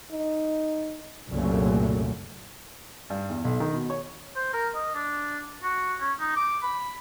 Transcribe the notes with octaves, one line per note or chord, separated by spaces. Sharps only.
D#4
C2 F#2 A#2 C#3 F#3 A3
G2
E2
B1
D#3
B2
C#5
C5
A#4
D#5
D4
F#4
C#4
D#4
D6
B5